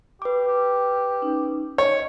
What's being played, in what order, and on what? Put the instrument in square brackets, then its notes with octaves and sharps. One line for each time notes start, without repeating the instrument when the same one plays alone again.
[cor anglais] G4 [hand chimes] B4 D6
[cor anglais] G4
[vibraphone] C#4 D#4
[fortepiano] C#5 [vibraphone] D#5